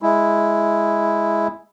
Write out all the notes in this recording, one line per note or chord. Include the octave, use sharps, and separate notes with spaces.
G#3 E4